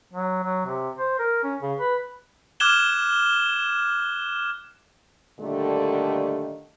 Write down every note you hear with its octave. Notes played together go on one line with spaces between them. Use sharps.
F#3
F#3
C3
C5
A#4
C#4
C#3
B4
D6 F6 F#6 G#6 E7 G7
A#2 D3 D#3 G3 A3